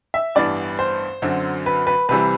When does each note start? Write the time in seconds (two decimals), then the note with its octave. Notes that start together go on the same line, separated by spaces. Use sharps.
0.14 E5
0.35 A1 G2 E3 B3 D4 D5
0.79 C5
1.22 F#2 D3 F#3 C4
1.66 B4
1.87 B4
2.09 C2 C3 E3 G3 B4